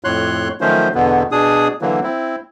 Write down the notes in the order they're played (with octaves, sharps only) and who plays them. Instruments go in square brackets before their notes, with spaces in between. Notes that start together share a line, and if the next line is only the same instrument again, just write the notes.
[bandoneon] F2 A2 C#5 C6 F#6
D#3 F3 F#3 A3 C#4 C5
E2 B2 D3 B3
B2 D4 G#4 D#6
D3 E3 F#3 A#3
C4 E4